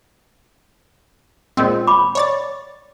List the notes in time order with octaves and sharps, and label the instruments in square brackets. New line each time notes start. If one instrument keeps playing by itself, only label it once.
[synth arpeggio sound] A#2 G#3 C4
[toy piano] B5 D6
[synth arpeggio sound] C#5 D5 A6